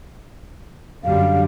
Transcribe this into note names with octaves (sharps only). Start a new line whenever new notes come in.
F#2 D3 G3 F5